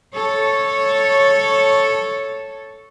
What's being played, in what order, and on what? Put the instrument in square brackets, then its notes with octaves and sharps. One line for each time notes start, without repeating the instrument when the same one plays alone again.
[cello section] A4 C#5